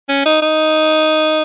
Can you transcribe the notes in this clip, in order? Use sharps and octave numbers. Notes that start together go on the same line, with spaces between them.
C#4
D#4
D#4